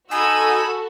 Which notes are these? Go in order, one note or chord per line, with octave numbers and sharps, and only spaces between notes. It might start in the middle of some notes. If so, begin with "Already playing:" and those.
D#4 F#4 A4 G#5 B5 E6